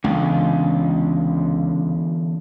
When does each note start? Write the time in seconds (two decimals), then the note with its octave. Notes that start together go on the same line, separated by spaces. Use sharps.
0.04 C#2 D3 E3 B3